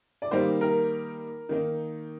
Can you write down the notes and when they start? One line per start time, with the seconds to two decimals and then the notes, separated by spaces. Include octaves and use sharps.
0.22 D5
0.31 D#3 G3 A#3 D#4 C5
0.61 A#4
1.49 D#3 A#3 D#4